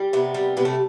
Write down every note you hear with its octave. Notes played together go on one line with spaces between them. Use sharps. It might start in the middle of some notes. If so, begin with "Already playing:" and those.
Already playing: G3
C3 B3
G3
C3 B3
A3